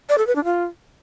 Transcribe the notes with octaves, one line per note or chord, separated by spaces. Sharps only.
D5
A4
B4
D4
F4